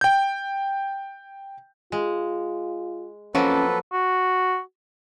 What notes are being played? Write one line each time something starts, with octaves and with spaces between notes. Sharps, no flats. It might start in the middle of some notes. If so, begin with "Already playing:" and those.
G5 G6
G#3 F4
F2 F3 F#3 A#3 C#4 A4 B4
F#4